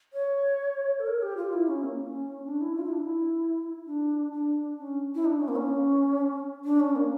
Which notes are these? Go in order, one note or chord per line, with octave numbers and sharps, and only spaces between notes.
C#5
A4
A#4
G4
F4
E4
C#4
A#3
C#4
D4
E4
F4
E4
D4
E4
D4
D4
C#4
E4
D4
C#4
A#3
C#4
D4
C#4
A#3